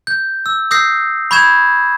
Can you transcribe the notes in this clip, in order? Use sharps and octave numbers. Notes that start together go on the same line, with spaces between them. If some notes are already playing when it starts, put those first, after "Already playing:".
G6
E6
D#6 E6 G6 A#6 C7
B5 C#6 G6 G#6 E7